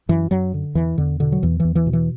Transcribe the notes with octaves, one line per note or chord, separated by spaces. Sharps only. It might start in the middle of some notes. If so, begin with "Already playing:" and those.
F#2 E3
F#2 F#3
D3
E2 E3
E2 D3
B2 D3
F#3
E2 E3
E2 E3
E3
B2
E3